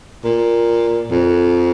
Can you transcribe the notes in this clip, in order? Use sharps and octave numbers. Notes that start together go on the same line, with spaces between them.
A#2
F2